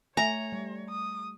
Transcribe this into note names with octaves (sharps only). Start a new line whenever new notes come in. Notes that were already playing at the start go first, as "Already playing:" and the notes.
A3 C#5 E5 G#5 A#5
G3
D#6